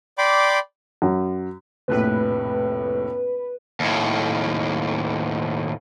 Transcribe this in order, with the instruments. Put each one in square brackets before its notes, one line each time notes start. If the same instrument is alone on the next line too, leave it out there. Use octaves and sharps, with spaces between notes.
[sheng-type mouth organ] D5 G5 B5 C6 D6
[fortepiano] F#2
[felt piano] F1 A#1 A2 [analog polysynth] B4
[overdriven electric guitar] D#2 A2